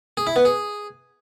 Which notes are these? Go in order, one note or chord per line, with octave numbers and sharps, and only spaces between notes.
G#4
E4
B3
G#4